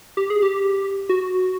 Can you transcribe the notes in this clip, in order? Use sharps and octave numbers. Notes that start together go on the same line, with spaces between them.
G4
G#4
G4
F#4